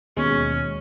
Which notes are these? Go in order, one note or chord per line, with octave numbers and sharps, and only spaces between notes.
D#2 B2 G#3 C#4